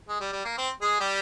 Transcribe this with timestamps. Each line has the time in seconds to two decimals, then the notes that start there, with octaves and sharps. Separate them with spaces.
0.08 G#3
0.21 G3
0.32 G3
0.45 A#3
0.58 C4
0.81 G#3 G#4
1.00 G3 G4